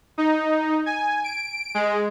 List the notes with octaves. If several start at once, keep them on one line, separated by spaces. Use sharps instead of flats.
D#4
G#5
D7
G#3